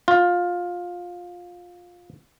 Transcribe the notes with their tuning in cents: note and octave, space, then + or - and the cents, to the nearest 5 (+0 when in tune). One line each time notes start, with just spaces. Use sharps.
F4 +15